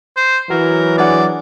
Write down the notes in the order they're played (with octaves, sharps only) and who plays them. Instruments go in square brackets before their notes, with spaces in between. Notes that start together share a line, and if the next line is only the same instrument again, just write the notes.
[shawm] C5
[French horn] E3 [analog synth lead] F#3 [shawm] A#4
[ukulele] D4 G#4 F#5 [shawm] D5